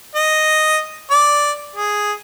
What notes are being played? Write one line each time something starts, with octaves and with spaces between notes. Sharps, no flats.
D#5
D5
G#4